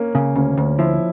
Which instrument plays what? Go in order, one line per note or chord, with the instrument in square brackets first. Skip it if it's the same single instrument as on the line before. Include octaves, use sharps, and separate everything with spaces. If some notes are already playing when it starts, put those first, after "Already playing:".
Already playing: [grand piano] A#3 C#4
[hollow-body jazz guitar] C#3
[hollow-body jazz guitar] D2 [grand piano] C#4
[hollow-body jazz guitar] D2
[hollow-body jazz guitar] F3 [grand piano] E4